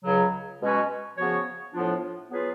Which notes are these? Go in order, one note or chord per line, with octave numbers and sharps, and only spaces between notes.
C#2 C#3 F#3
B2 G#3 C#4 F#4 B4
C#3 F3 B3 F#4 C#5
A2 F3 B3 D4 F4
F#3 B3 F4 G#4 B4